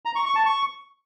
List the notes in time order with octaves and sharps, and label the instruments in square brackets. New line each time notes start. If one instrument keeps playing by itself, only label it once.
[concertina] A#5
C#6
C#6
A5
C#6